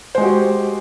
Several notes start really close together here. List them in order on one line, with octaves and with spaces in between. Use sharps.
C5 G#3 F#4 G4